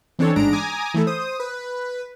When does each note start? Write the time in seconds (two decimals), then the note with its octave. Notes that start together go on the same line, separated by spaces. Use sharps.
0.19 E3 C4 D4 A4 C#5
0.36 A1 G#2 G#3 D4 A#5 D7
0.53 G#5 A#5 D6 D#6
0.94 E3 A3 E4 A4
1.07 C5 D#6
1.40 B4